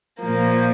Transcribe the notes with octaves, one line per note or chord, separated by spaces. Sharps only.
A#2 F3 A#3